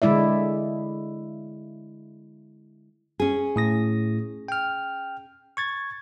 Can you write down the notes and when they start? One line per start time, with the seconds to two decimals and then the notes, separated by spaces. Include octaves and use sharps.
0.02 D3 G#3 E4 D5 E5
3.20 C#4 G#4
3.56 A2 D#6 A#6
4.48 G5 F6
5.57 C#6 G#6 A6